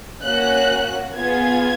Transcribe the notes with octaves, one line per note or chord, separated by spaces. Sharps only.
A#3 C#4 F#4 F#6
B3 F4 G#4 G#6